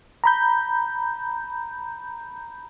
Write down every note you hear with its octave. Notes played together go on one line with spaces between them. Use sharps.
A#5 B5 G6